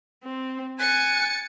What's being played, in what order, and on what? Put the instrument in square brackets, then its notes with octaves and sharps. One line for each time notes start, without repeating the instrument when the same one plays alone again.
[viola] C4
[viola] G#5 [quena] F#6 [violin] A6 C#7